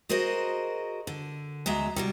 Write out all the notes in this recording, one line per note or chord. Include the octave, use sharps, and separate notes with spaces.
F#4 G#4 A#4 C5 D#5
D3
D2 F#3 G#3 E5 A#5
C3 E3 F#3 G3